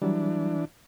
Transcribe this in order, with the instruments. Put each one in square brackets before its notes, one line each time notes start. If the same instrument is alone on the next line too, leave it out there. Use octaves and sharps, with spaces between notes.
[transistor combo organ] E3 D4 [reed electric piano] F#3 G3